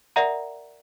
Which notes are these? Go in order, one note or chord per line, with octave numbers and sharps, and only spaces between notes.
A#4 D5 E5 F#5 A#5